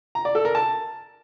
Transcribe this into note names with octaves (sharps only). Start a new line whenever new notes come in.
A#5
D5
A4
A#4
A5